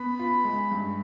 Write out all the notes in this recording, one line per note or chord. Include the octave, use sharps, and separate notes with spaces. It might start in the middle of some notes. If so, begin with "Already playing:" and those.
Already playing: B3 B5
F4
G#3
G2